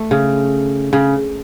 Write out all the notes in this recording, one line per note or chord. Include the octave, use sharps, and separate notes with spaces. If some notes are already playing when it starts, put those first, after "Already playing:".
Already playing: A3
C#3
C#3